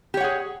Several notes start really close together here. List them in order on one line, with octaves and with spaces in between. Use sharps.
G4 C#5 F#5 G#4